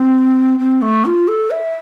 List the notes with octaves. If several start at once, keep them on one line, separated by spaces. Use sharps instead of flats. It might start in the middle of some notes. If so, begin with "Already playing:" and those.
Already playing: C4
C4
A3
F4
A4
E5